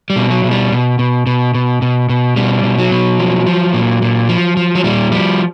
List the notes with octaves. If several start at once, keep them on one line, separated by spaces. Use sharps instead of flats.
G3
B2
F#3
B2
G3
B2
B2
B2
B2
B2
B2
B2 G3
B2
F#3
B2
F3
F3
A#2
A#2
F3
F3
F#3
A#2 G3
F3 G3